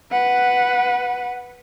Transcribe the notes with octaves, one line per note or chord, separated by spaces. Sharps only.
B4 F#5